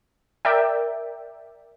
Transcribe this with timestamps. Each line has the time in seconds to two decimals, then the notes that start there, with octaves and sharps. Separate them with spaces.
0.45 A#4 D5 E5 G5